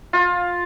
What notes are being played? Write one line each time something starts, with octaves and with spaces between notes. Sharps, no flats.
F4